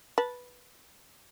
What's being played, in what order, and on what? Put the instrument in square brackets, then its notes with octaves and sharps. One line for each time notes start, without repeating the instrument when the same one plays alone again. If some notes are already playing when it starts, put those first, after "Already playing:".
[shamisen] B4 A5